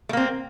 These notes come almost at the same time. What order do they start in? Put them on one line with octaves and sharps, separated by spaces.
A3 A#3 C4